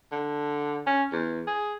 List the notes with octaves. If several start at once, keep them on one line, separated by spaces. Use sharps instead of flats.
D3
C#4
E2
G#4